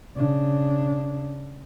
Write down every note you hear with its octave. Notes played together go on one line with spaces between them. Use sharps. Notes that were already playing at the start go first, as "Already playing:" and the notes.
C#3 D4